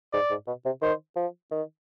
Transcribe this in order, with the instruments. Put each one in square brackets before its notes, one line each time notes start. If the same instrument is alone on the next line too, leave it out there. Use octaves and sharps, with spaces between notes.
[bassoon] G#2 [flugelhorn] D5
[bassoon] G#2
B2
C3
[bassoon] D#3 [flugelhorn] C5
[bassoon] F3
D#3